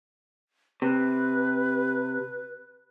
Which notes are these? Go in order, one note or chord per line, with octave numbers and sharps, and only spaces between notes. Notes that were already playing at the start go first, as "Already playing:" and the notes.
C3 B4